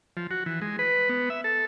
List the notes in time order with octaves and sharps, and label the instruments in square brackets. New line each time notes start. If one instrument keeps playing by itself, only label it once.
[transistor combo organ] F3
F#4
E3
G#3
B4
B3
E5
A4